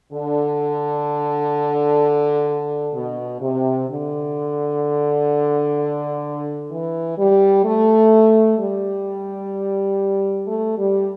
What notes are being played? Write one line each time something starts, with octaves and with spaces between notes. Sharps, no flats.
D3
B2
C3
D3
E3
G3
A3
G3
A3
G3